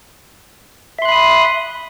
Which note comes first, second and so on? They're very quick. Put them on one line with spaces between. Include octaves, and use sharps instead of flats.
E5 C6 F#6 B5 D#6